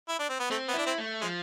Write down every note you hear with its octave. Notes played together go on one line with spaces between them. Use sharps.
E4
D4
C4
B3
A3 C4
B3
D4 E4
C4
A3
F3 G#3